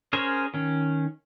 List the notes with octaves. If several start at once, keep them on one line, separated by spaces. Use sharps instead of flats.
C#4 G#4 A#4 C5 C#5
D#3 C#4